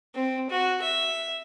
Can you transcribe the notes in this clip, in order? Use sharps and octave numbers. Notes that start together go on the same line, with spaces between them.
C4
F#4
E5